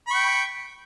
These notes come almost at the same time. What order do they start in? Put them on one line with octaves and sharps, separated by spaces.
B5 C#6 G5